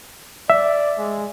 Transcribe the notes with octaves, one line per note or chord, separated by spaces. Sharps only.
D5 E5
G#3